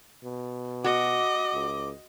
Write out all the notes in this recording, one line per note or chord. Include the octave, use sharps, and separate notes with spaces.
B2
F#4 D#5 D6
C#2